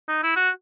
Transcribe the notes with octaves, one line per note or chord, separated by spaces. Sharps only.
D#4
E4
F#4